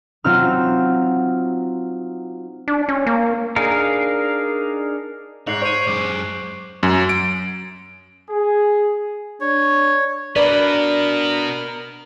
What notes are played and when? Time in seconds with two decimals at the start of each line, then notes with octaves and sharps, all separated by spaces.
0.24 F#3 C4 D#4 F4 E6 F6
2.68 D4
2.89 C#4
3.07 A#3
3.56 D4 D#4 G#4 A#4 F5
5.47 G#2 C#5 F#6 C7 F#7
5.62 C5 C#6 D7 D#7
5.87 F#2 G#3 D6
6.83 F#2
7.09 D7
8.29 G#4
9.41 D4 C#5
10.36 B2 B3 D4 A#4 B4 D5